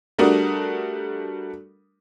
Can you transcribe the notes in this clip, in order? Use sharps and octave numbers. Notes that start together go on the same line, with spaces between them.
G3 A3 D4 F#4 A#4 D#6